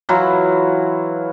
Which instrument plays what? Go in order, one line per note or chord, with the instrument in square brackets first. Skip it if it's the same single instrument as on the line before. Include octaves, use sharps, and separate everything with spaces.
[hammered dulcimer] E3 F#3 E4 F4